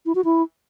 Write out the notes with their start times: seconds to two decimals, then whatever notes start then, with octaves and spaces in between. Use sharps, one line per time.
0.06 E4
0.15 F#4
0.25 E4